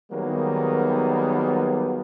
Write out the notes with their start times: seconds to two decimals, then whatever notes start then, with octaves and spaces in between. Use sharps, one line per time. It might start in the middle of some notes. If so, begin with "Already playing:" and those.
0.12 D#3 F#3 G3 A#3 B3 G#4